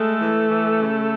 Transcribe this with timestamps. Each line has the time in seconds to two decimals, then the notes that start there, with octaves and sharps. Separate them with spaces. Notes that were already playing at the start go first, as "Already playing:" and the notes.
Already playing: G#3 A3 A4
0.21 E3
0.50 E3
0.80 C#3